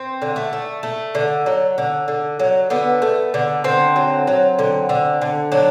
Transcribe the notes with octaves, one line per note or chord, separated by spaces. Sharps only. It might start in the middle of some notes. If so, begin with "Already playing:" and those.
Already playing: C4
D3
A3
A3
A3
D3
F#3
D3
D3
F#3
D3 B3
A3
D3
D3 C4
F#3
F#3
D3
D3
D3
F#3 D4